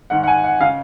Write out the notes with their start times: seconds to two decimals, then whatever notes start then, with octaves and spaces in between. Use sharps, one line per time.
0.10 G#2 D#3 F#5
0.23 F#5
0.27 G#5
0.44 F#5
0.60 C#3 F5